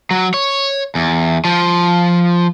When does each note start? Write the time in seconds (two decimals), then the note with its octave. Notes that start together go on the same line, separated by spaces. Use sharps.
0.11 F#3
0.34 C#5
0.95 E2
1.45 F3